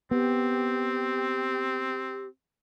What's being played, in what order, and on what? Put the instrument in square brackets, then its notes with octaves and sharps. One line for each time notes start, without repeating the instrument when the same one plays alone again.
[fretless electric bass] B3 [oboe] C4 [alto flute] G4